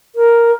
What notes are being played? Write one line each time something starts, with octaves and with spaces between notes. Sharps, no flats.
A#4